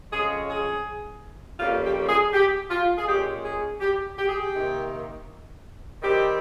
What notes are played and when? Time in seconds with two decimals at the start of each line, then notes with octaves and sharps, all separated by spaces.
0.11 F2 C#3 G#3 C#4 G#4
0.49 G#4
1.59 F2 C#3 G3 A#3 C#4 F4
1.84 G4
2.09 G#4
2.33 G4
2.70 F4
2.98 G#4
3.08 A#2 G#3 C#4 G4
3.44 G#4
3.81 G4
4.18 G4
4.29 G#4
4.41 G4
4.55 C3 D#3 A#3 D#4
6.02 D#3 G3 C4 G4